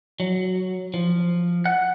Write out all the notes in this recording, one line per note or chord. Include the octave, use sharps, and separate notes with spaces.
F#3
F3
F#5